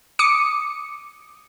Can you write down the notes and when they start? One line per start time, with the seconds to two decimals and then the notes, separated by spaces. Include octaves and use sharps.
0.19 D6 D#6 C#7